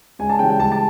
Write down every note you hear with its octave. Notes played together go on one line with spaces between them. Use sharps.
C#2 G#5
A5
C#3 E3 G3 G5
G5
C#2 A5
A5